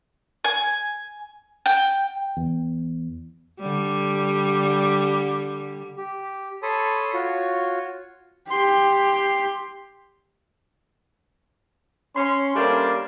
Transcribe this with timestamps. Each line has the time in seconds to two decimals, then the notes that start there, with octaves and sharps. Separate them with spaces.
0.44 G#5
1.66 G5
2.37 E2
3.60 D3 G3
5.98 G4
6.63 A4 C#5 A5 B5 C6 D#6
7.13 F4 F#4 C#5
8.50 G4 C6
12.16 C#4 C6
12.55 G3 A3 A#3 C#4 D4 C5